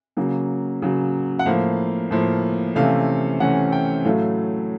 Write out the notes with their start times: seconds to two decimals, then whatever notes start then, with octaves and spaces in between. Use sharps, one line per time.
0.17 C#3 F#3 A#3
0.82 C#3 F#3 A#3
1.39 F#5
1.46 A2 F3 A#3 F5
2.11 A2 F3 A#3
2.75 C3 E3 A3 C#4 F5
3.40 C3 E3 A3 C#4 F#5
3.72 G5
4.05 A2 F#3 A3 F5